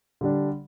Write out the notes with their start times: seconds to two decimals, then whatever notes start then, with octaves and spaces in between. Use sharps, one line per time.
0.21 D3 G3 D4